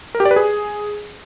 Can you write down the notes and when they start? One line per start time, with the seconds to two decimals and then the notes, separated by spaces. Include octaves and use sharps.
0.15 A#4
0.20 G4
0.25 D5
0.31 B4
0.36 G#4